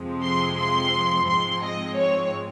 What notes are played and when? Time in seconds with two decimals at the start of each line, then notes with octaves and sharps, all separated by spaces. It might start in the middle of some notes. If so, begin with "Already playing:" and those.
Already playing: F2 C3 F3 G#3 C4
0.22 C6
0.57 C6
1.27 G#2 F3 G#3 C4 C6
1.63 D#5
1.97 C#5